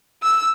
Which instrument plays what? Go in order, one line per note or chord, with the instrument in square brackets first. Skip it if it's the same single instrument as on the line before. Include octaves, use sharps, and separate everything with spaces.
[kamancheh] E6